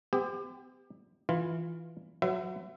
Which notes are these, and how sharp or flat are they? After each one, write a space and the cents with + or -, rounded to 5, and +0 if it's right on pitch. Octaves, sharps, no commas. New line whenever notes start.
C4 -45 G4 +30
E3 +0 F4 +0
F#3 +0 B4 +45 E5 +25